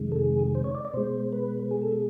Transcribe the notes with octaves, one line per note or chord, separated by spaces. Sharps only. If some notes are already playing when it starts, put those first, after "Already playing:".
Already playing: F2 C3 D#3 G#3
A4
G#4
C5
C#5
D5
D5
B2 G#3 C5
B4
G#4
A4
G#4